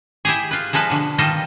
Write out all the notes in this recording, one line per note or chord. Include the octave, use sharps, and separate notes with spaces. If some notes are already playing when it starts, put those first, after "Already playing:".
E4 G4 G#4
F4 B4
F3 G#3 A4 B4
B2 D3
D#3 G3 F4 A4 D#5